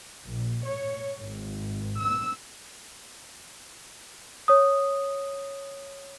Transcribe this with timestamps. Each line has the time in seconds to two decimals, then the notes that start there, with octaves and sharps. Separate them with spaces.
0.24 A#1
0.65 C#5
1.18 G#1
2.00 E6
4.48 C#5 D#6